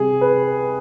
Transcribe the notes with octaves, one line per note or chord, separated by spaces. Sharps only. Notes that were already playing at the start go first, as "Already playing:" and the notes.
Already playing: C3 G3 G#4
B4